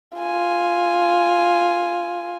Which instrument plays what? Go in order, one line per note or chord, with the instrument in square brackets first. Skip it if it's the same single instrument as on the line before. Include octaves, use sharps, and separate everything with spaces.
[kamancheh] F4 G#5